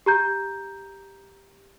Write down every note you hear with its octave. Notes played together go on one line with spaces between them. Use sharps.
G4 A#5 G6